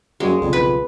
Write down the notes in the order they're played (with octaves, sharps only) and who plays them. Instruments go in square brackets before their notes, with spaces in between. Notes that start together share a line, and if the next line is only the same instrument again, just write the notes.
[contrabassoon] F#2 [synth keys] G3 A#3 D4 [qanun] G#3
[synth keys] B1 C#3 G3 [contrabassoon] F2
[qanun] B4